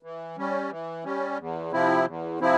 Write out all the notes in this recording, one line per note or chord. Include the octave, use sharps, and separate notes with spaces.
E3
G3 C#4
E3
G3 C#4
E2
C3 F3 C4 E4
E2
C3 F3 C4 E4